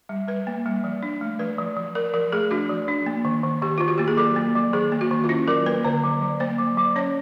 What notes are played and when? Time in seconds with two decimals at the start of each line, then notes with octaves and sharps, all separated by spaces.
0.09 G3
0.28 G3 B4
0.47 A#3
0.66 G3
0.84 F3
1.03 D4
1.21 A3
1.39 F3 B4
1.58 F3
1.77 F3
1.95 F3 A#4
2.14 F3 A#4
2.32 A3 G#4
2.51 D4 F#4
2.69 F3
2.88 D4
3.06 A#3
3.25 D#3
3.44 D#3
3.62 D#3 G4
3.78 D#3 F4
3.88 F#4
3.98 A#3 G4
4.08 G#4
4.17 F#3 A4
4.36 A#3
4.55 F#3
4.73 D#3 G#4
4.92 A#3
5.01 F#4
5.11 D#3
5.24 F4
5.29 C#4 E4
5.48 F#3 A#4
5.66 A#3 B4
5.85 D3 C5
6.03 F#3
6.22 F#3
6.40 A#3 C5
6.59 F#3
6.77 F#3
6.96 C#4 C#5